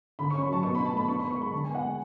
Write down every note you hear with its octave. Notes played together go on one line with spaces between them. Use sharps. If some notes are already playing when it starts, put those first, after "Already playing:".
D3 B5
C#6
C#4
B5
F#3 A5
B2 C#6
B5
D4
A5
A3 B5
D4 C#6
B5
B3
C#6
G#3 B5
D3 A5
G#5
B3
F#5
G#3 G#5